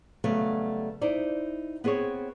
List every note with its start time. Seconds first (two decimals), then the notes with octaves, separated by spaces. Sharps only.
0.24 C#3 F#3 G3 A3 B3
1.01 D#4 E4 C5 D5
1.84 B3 C4 G#4 C5 C#5